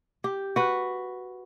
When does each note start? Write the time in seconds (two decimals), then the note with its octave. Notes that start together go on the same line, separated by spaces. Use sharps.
0.24 G4
0.56 F#4 B4